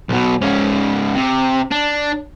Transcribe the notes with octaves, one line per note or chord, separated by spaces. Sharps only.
B1 B2
G#2 C#4
C3
D4